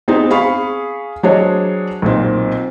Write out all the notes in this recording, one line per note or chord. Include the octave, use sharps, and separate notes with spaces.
B3 C4 D#4 G#4
G#4 F5 B5 C#6
F#3 D4 G#4 C5 C#5 D#5
B1 A#2 C4